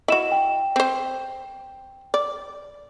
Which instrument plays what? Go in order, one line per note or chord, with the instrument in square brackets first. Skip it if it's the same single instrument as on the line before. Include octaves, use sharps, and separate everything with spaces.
[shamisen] E4 F#4 [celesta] D#5 E7
[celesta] G5
[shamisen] C4 C5
D5